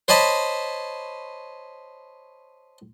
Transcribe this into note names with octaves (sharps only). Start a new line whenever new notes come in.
C5 C#5 D#5 A5 B5